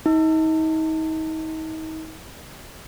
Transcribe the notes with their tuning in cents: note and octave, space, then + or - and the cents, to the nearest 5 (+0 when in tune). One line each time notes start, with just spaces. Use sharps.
D#4 +35